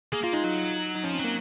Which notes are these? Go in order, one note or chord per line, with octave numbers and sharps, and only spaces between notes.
A#3 G#4
A#3 F4
G#3 D#4
F#3 D#4
D#4
F3 C#4
C4
F#3
A#3